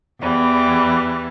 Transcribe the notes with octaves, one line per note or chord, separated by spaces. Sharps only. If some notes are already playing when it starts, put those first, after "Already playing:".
E2 E3 G3